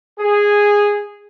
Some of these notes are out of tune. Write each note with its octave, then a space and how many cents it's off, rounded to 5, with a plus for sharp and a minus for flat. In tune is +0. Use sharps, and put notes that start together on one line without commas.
G#4 -10